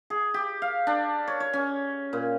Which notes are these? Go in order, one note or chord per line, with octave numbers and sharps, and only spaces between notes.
G#4
G4
F5
D4
C#5
C#5
C#4
A#2